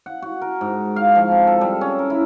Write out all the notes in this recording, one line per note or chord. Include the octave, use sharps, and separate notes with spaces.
F#5
F#4
A#4
G#2
F5
F3
C4
A4
G3
C#4
A#4
E4